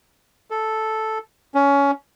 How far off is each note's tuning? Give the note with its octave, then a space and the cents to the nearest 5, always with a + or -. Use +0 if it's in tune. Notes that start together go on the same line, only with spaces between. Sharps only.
A4 -5
C#4 +20